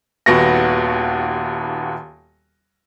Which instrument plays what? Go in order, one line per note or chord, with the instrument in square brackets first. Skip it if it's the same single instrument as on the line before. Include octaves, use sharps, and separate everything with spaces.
[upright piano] D#1 D#2 B3 F#4 F#5 A#6